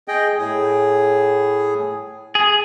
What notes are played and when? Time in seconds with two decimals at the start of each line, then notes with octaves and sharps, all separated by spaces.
0.08 G#4 D#5 G5
0.38 A2 G#4
2.35 G#4